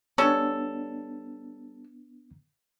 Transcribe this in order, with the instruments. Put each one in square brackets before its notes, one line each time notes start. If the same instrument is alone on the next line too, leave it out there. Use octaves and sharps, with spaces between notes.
[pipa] G3 C#4 A4 [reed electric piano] B3 D4